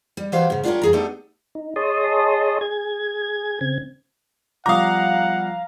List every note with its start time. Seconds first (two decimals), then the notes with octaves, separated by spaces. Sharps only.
0.17 G3
0.32 E3 F#3 G4 B4 C5 F5
0.50 G#2 C#3
0.64 D4 F4 G4 G#4 A#4 C#5
0.82 F2 G#4 A#5
0.93 A3 B3 D4 D#4 G4 A4
1.55 D#4
1.76 G#4 C#5 D#5 A5 C6 D#6
2.61 G#4 G#6
3.61 C#3 C4 G#6
4.66 F3 G3 B3 F5 F#5 A#5 D6 D#6